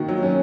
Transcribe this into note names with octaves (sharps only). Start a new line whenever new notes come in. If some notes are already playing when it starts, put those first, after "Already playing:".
Already playing: D#3 A#3 F#4
F#3
C#4